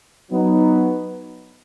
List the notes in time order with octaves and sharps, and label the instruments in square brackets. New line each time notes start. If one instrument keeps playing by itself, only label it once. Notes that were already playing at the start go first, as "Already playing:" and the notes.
[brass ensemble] F#3 B3 D#4